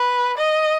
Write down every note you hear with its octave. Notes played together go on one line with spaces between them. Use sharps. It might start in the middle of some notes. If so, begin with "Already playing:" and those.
Already playing: B4
D#5